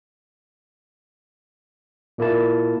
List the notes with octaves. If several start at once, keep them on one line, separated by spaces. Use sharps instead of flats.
A#2 A#3 E4 A5